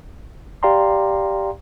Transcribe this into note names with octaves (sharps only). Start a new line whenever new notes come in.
G4 D5 F5 G5 A#5 C6